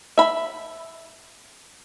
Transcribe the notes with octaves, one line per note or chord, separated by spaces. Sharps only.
E5 B5